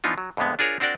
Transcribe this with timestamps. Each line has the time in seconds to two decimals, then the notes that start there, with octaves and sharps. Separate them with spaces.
0.04 E3 F3 B3 D4 D#4 F4
0.18 F#3
0.37 F2 A2 D3 G#3 B3
0.59 D4 F4 G#4 A#4 C#5
0.80 C4 D4 F#4 A#4 D5 G5